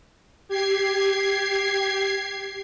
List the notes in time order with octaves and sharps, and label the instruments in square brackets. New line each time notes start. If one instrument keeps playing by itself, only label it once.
[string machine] G4 G#6 C7